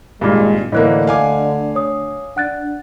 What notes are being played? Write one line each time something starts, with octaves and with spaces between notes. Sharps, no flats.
G#1 G2 A#2 G#3
D2 A2 D3 E3 A#3 D#5 F#6
F5 G#5 D6
C#5 D#6
D4 F#5 F#6 A6